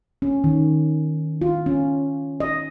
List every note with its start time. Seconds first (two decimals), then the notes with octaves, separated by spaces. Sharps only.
0.22 C#4
0.44 D#3
1.41 F4
1.66 C#4
2.40 D#5